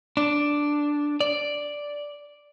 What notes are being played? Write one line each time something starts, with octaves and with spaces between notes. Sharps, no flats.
D4
D5